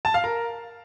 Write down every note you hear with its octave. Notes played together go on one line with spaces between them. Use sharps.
A5
F5
A#4